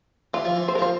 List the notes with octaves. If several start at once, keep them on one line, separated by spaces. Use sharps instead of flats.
E3 F4
F3
E3
C5
A#4
F3
C5